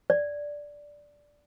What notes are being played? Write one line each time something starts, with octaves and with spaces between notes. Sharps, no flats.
D5